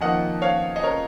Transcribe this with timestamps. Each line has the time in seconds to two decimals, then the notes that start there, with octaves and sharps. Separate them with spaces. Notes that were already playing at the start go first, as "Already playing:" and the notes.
0.01 F2 D#3 A#3 D#5 F#5
0.42 C#5 F5
0.76 D#5
0.83 A#4 C#5